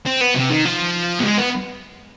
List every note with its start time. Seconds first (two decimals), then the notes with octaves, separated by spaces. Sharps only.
0.06 C4
0.21 B3
0.35 C3
0.50 D#3
0.65 F3
1.19 B3
1.23 G#3
1.38 B3